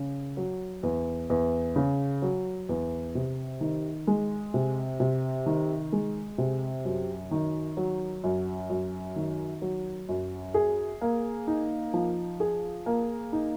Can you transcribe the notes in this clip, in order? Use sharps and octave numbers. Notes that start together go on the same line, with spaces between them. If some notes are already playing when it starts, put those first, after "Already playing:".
Already playing: C#3
F#3
E2
E2
C#3
F#3
E2
C3
D#3
G#3
C3
C3
D#3
G#3
C3
F#2
D#3
F#3
F#2
F#2
D#3
F#3
F#2
G#4
A#3
D#4
F3
G#4
A#3
D#4